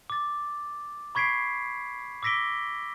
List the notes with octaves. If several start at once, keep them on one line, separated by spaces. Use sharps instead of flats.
D6 A6
B5 C#6 G#6 B6 C7 D7
D6 E6 A#6 B6 D7 G7